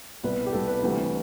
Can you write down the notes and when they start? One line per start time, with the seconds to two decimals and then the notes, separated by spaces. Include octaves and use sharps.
0.24 C2 B2 G3 B4
0.46 G4
0.52 C2 B2 G3 A4
0.68 B4
0.82 D2 C3 E3 G3